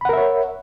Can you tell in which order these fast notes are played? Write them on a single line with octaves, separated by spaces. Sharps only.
B5 F#5 A#4 E5 C#5